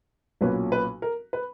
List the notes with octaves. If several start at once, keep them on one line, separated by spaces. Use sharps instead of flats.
B1 A#2 F#3 A#3 C#4 B4
B4
A#4
B4